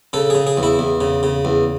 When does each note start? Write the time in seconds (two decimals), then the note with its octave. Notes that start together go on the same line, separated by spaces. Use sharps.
0.13 C#3 A4
0.30 C#3 G#4
0.47 G#4
0.57 E2
0.63 E4
0.79 E2
1.01 C#3
1.23 C#3
1.45 E2